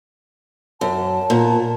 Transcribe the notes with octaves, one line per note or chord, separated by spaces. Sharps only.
F#2 A5
A#2